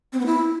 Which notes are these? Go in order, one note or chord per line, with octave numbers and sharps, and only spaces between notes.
C4
B3
E4